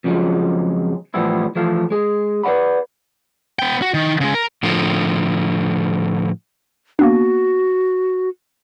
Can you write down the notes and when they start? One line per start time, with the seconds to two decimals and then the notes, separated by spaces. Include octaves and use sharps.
0.04 F2 C#3 F3 F#3 G#3
1.14 A2 E3 F3 G3 B3 E4
1.55 E3 F3 A3 F5
1.90 G#3 G#4
2.43 B4 D5 D#5 F#5 B5
3.59 B3 G5
3.82 F#4
3.94 D#3
4.21 C#3 G#3
4.34 A#4
4.63 A2 D3 F3
6.99 A#3 B3 D4 F#4